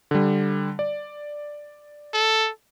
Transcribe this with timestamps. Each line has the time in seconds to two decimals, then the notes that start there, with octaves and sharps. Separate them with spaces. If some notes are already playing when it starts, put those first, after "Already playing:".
0.11 D3 G3
0.79 D5
2.14 A4